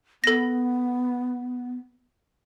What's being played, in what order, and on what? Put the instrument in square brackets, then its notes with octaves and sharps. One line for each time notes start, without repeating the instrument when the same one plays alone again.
[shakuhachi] B3 [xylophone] A4 A#6